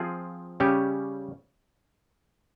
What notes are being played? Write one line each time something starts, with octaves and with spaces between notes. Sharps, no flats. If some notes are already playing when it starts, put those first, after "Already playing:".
Already playing: F3 C4 F4 G#4
C#3 G3 C#4 G4